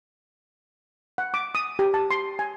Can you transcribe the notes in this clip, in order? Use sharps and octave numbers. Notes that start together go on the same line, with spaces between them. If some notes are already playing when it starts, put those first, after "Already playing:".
F#5
D6
D#6
G4
A5
C6
G#5